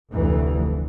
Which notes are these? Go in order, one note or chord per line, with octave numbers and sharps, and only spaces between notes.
F1 D2 E3